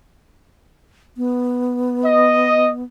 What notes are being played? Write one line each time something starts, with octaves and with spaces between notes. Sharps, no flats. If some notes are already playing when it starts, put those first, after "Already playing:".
B3
D#5